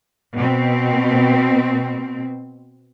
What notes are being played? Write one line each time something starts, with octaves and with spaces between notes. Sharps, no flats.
B2 C4